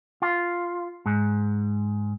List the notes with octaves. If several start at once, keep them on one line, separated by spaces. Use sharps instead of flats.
F4
G#2